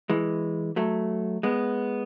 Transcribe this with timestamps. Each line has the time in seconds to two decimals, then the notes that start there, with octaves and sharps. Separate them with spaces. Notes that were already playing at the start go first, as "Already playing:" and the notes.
0.10 E3 G#3
0.76 F#3 A3
1.43 G#3 B3